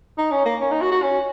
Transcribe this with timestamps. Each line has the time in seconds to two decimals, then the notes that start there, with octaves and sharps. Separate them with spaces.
0.18 D#4
0.31 C#4
0.45 A#3
0.61 C#4
0.71 D#4
0.81 F#4
0.92 F#4
1.03 C#4